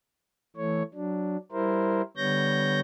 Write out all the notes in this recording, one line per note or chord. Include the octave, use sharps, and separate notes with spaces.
E3 A3 C#5
F#3 D4
G3 E4 A#4 C5
D3 G3 B3 C#5 G6 A#6